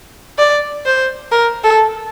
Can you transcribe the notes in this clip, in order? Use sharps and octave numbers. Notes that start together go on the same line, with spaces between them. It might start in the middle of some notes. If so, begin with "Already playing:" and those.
D5
C5
A#4
A4